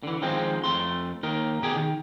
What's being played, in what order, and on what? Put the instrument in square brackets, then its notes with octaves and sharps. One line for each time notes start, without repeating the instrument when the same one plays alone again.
[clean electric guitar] D3 E3
D#3 F3 G#3 C4
F2 A3 C6
D#2 D#4 A#4
B2 G4 G#4
D#3